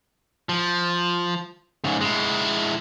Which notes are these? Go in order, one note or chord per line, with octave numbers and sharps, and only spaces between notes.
F3
G#2 C#3
G#3 E4